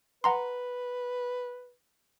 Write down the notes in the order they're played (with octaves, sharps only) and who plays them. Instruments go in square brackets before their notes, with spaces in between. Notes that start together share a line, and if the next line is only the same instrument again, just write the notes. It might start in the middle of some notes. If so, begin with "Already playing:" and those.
[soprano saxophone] B4 [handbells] F#5 A#5 C6